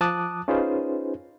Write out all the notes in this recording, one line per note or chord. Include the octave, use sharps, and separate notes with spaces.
F3 A5 D6 D#6 F#6
C#4 D#4 F4 G#4 B4 C5